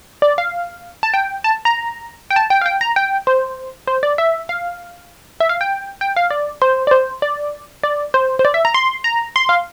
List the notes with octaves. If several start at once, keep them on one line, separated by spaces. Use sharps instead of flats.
D5
F5
A5
G5
A5
A#5
G5
A5
G5
F5
G5
A#5
G5
C5
C5
D5
E5
F5
E5
F5
G5
G5
F5
D5
C5
D5
C5
D5
D5
C5
C5
D5
E5
A#5
C6
A#5
C6
F5